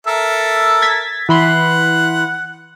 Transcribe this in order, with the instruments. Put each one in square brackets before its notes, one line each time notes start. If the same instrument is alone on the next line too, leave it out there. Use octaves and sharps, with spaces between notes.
[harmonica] A4 A#4 E5
[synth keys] G#6 A6 B6
[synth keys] E3 B5 C6 [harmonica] F#5